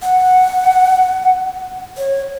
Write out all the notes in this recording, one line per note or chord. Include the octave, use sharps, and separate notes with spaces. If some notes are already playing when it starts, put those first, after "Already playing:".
F#5
C#5